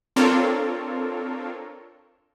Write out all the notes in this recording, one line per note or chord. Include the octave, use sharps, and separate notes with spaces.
C4 D4 F4 A4 A#4 C#5